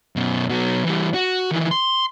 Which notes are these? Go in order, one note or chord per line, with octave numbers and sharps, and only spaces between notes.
F#2 B2
B2 F#3
E3 G3
F#4
D#3 E3
C6